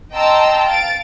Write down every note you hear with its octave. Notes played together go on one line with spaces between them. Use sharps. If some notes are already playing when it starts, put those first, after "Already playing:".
D#5 G5 A5 A#5 C6 E6
F5 A6 D7